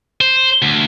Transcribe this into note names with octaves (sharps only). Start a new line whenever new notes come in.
C5
D2